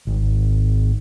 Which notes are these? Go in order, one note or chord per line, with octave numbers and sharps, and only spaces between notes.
G#1